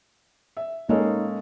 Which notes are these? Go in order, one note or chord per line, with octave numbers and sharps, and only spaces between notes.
E5
G#3 A#3 C#4 D#4 A4